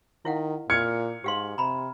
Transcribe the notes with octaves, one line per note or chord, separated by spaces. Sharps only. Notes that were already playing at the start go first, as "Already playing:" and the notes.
D#3 E4 F5 F#5
A#2 F6 G#6 C#7
G#2 G4 F5 C6
C3 A#5 B5